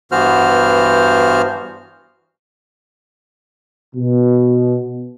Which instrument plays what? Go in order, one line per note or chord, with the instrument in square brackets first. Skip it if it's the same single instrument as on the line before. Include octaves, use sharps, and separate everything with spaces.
[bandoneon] G2 E3 B3 F#4 C5 F6
[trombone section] B2